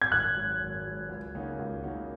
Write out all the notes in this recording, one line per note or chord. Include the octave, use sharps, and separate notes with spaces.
G#6
G#1 F#6
G#2 F#3
G#1
G#2 F#3
C#2
C#3 A#3 D#4 F#4
C#2
C#3 A#3 D#4 F#4